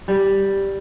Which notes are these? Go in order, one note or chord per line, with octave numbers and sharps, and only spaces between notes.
G3